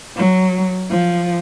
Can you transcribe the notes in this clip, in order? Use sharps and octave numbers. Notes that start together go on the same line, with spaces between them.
F#3
F3